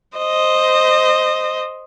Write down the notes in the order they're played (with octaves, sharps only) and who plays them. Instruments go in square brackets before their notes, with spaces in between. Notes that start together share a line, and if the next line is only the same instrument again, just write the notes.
[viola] C5 D#5